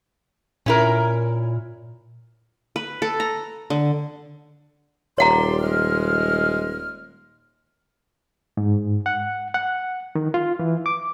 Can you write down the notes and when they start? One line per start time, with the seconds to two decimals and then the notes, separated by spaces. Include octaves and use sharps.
0.66 A#2 C#4 E4 A#4
2.76 B4
3.02 A4
3.20 A#5
3.70 D3
5.18 D#1 G4 C#5 D5 F#5 A#5 C6
5.61 G#3 F6
8.57 G#2
9.06 F#5
9.54 F#5
10.15 D#3
10.34 F4
10.59 E3
10.86 D6